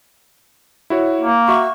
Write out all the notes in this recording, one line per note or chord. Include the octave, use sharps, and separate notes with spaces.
E4 F#4 C#5
A#3
F#4 E5 C#6